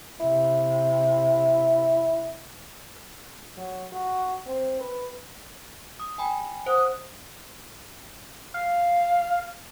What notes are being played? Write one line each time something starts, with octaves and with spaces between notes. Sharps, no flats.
C3 E4
F#3
F#4
C4
B4
D#6
G5 G#5 B5
C5 F#5 D#6 F#6 D7
F5